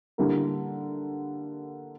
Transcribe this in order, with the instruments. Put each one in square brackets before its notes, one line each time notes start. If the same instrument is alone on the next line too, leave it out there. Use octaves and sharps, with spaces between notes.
[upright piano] D3 G3 A#3 E4 A#4